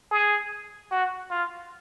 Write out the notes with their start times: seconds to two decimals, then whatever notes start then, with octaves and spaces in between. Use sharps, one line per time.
0.11 G#4
0.91 F#4
1.31 F4